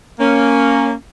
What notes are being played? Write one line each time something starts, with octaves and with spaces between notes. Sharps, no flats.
A#3 C#4